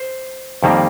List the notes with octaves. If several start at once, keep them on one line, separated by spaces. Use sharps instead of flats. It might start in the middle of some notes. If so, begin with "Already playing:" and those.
Already playing: C5
F2 D#3 G3 A#3